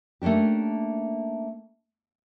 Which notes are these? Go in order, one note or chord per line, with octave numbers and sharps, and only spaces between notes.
A3 A#3 C#4 D4 G4